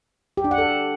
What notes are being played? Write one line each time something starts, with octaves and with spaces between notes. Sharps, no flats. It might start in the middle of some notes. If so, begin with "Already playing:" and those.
G4
D4
F#5
A4